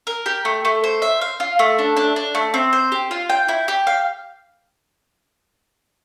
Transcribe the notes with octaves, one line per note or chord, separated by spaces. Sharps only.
A#4
G4
A3
A3
C5
E5
F5
F4
A3
D4
D4
D4
A3
C4
C5
G4
F4
G5
E4
G4
F5